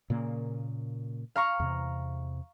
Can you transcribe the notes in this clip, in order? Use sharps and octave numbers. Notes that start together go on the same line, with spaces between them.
A#2 C#3 A#3
F5 A#5 C#6
E2 C3